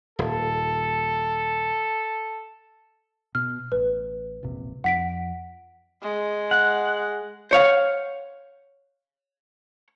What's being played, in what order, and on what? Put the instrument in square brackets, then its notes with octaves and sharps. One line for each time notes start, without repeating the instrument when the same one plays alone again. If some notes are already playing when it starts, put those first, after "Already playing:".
[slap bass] D#1 [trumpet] A4
[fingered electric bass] B2 [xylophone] F6
[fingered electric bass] A1 [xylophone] B4
[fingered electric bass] E1 A#1 C3
[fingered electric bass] F2 [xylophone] F#5 B6 D7
[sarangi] G#3
[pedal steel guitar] F#5
[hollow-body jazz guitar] C5 C#5 F5 F#5